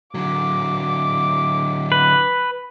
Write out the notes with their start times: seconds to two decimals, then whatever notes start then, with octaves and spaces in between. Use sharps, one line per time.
0.15 D3 F#3 D6
1.92 B4